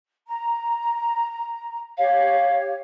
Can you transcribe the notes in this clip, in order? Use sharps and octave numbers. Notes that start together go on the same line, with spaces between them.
A#5
G4 C#5 F5